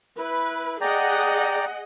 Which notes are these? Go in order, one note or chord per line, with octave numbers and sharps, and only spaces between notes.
E4 B4
G#4 D5 D#5 F#5 G5 A#5